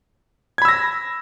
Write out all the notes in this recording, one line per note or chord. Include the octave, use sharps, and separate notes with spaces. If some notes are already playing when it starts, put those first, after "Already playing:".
B5 E6 G#6 A#6